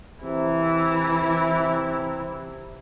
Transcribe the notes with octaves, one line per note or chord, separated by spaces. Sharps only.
C3 E3 E4